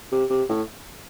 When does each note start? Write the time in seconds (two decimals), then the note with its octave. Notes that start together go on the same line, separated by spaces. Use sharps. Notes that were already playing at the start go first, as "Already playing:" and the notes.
0.12 C3
0.30 C3
0.49 A2